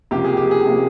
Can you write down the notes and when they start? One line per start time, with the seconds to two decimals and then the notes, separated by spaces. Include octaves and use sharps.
0.11 C#2 C3 F3 A#3 G4
0.25 G#4
0.37 G4
0.51 G#4
0.65 C3 F3 A#3